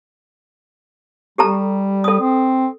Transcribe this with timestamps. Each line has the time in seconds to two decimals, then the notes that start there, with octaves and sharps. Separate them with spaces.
1.38 G3 G4 A4 A#5
2.04 A4 D#6
2.20 C4